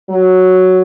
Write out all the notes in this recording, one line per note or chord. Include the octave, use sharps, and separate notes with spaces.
F#3